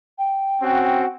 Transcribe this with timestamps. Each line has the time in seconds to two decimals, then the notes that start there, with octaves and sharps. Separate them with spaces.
0.18 G5
0.62 C4 C#4 F#4